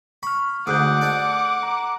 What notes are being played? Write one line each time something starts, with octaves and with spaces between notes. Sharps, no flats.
B5 C#6 F6
D2 G#2 F#5 D6 D#6 F#6 G6
A4 D5
A#5